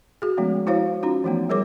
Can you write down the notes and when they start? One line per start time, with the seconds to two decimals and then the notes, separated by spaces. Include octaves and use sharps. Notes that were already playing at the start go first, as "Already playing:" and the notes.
0.22 F#4 G#4
0.37 F3 G#3 A3 B3 C#4
0.67 E4 F#4 C5 C#5 F5
1.03 C#4 D#4 F4 F#4
1.24 E3 F3 A3 B3
1.49 G3 G#4 A#4 C#5 D6